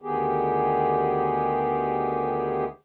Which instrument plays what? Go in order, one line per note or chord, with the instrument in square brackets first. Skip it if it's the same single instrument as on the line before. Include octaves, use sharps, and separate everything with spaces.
[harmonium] D2 D#3 B3 G4 G#4